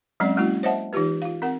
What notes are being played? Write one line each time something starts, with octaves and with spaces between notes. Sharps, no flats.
F#3 G#3 C4 C#4 D5
F#3 G#3 A#3 C#4 E4 F#4
C5 C#5 D#5 E5 F#5 A5
E3 D#4 F4 G4 B4
F4 F5
C4 A#4 F#5